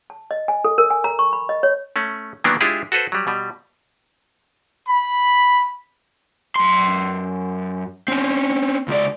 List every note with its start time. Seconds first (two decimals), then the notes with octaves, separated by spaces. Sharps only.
0.10 A5
0.31 D#5
0.48 G#5
0.65 A4
0.78 A#4
0.90 G#5
1.04 A#5
1.19 C#6
1.33 B5
1.49 D#5
1.63 C#5
1.96 A3 C#4
2.44 D#3 E3 F#3 A#3 B3 D4
2.61 G#3 D4 E4 F4 G4 G#4
2.92 F#4 A4 B4 C5
3.12 F#3 G3
3.27 B2 G3
4.88 B5
6.56 F#2 C6
8.08 C4 C#4
8.88 C#2 D5